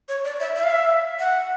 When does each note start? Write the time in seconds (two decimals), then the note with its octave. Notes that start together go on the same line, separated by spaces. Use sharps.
0.08 C#5
0.24 D5
0.40 E5
0.56 E5
0.64 F5
0.70 E5
1.19 F#5